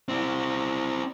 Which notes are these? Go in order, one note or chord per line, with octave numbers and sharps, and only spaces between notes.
C4 E4